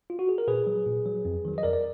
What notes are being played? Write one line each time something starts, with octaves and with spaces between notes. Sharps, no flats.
F4
F#4
G#4
A#4
A#2 G#4 B4
F#3
A#2
F#3
F2
D#3 F#3
D#5
F2 A#4 D5
D5